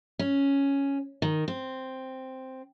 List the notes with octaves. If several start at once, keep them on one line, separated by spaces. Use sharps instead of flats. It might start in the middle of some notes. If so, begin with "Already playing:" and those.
C#4
D#3
C4